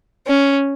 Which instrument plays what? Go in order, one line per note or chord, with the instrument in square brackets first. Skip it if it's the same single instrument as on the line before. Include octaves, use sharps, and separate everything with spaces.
[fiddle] C#4